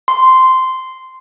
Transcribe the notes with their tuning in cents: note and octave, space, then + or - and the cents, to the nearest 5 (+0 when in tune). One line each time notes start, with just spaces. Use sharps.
C6 -10